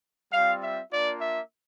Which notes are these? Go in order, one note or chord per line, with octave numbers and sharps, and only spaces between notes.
G3 C4 F4 F5
E5
A#3 D4 F4 D5
E5